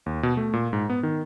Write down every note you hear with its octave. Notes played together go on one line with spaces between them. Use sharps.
D#2
B2
A3
A#2
G#2
B3
D#3